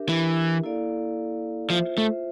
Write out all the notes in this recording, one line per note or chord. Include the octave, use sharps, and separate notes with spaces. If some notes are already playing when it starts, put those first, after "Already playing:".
Already playing: D4 G4 A#4 E5
E3
A#3 E4 A4 D5 F5
F3 F4 C5 E5
A3